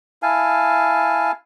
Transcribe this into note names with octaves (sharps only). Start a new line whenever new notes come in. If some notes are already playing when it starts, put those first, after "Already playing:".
E4 F5 G#5 A5